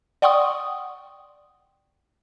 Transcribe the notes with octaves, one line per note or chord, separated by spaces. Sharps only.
D5 F#5 G5 C6 C#6 D#6